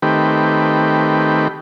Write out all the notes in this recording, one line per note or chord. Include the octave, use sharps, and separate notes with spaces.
D#3 A3 C4 G4 B4